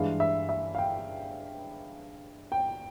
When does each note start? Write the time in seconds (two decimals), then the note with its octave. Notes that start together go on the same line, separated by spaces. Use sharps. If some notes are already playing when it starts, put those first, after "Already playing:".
Already playing: G2 E3 G#3 F5
0.20 E5
0.49 E5
0.75 F5
0.78 G5
2.52 G5